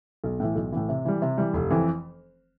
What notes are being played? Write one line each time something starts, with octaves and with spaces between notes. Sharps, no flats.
B1
A2 E3
B1
A2 E3
C3
E3 G3
C3
E3 G3
F1
F2 E3